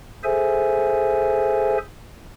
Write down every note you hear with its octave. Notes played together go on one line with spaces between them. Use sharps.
G#4 A4 C5 E5 G#5